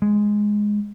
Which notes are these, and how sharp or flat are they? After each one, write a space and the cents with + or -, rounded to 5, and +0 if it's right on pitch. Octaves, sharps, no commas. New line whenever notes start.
G#3 +0